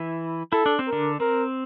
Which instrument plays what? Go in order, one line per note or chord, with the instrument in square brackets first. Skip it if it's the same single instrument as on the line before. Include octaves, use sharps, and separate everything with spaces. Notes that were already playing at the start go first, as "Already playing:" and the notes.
Already playing: [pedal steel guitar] E3 E4
[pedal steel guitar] E4 [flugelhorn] A4
[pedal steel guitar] D4
C4
[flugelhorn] A#4
[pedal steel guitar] D3 D4
[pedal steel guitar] C4 [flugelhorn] A#4